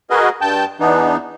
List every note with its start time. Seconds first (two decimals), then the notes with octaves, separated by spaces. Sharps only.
0.10 F#4 G#4 A#4 B4 D#5
0.41 G2 G5 A5
0.80 E2 E3 B3 D4 D#4